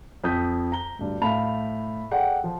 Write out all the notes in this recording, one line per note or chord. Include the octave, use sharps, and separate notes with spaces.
F2 D#6 G6 B6
A#5 G7
D2 G2
A2 F5 A5 B5 F7
G#4 A4 D5 F#5 G5
F3